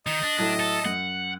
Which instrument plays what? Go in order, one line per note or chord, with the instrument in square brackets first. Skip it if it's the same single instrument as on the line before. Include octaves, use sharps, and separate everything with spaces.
[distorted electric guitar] D#3 [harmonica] D#5
[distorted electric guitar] D4
[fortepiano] A2 F#3 A3 [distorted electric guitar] D4
[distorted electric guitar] A4
[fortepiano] F#2 [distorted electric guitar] F#5